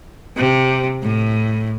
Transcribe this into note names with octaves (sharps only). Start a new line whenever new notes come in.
C3
A2